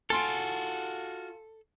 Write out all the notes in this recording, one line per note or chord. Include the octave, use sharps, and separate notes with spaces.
F4 F#4 A4 G#5 C6 D7